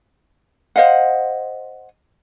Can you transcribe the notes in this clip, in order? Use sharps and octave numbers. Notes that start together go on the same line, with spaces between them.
C5 D#5 F5 F#5